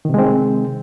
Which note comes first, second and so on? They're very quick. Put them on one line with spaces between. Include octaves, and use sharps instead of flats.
D#3 C3 G#3 C4